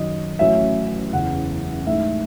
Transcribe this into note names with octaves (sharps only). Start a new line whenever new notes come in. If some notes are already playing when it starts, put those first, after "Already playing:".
Already playing: F#2 D#3 F#3 D#5
A1 A2 F#3 C#4 E5
F#1 E2 C#3 F#5
A2 G#3 D#4 E5